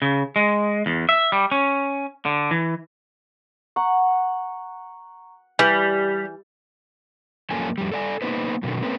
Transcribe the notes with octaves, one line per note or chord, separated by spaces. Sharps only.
C#3
G#3
E2
E5
G3
C#4
D3
E3
F#5 A#5 C#6
E3 G3 G6
F#2 F3 A#3 C#4 A4 G#5
F2 G3
A4 D5 G#5
A#3 B3 D#4 B4 C5
F#2 B2 D3 D#3
A3 A#3 C4 C#4 B4